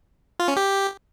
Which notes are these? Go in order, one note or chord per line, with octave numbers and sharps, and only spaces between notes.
F4
C#4
G4